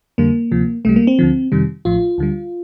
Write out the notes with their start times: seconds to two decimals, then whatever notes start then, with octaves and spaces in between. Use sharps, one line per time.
0.18 F2 D3 G3 A#3
0.51 D2 C3 F3
0.85 C2 C3 G3 A3
0.96 A#3
1.07 C4
1.19 D2 D3 F3
1.52 F2 C3 D#3 G3
1.85 A1 A2 F3 F4
2.18 D2 D3 G3